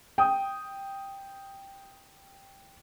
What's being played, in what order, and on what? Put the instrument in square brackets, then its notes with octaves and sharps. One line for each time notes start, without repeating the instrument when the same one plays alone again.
[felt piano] G5 D#6